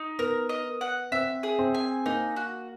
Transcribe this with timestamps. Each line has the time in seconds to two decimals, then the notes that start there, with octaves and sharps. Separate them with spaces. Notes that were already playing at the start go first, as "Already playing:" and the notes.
Already playing: D#4
0.19 B3 A#4
0.49 D#5
0.81 F#5
1.12 C4 E5
1.43 G#4
1.59 C4
1.75 G#5
2.06 A#3 D#4
2.36 F#4